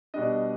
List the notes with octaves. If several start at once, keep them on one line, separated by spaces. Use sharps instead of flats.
B2 G3 D4 D#5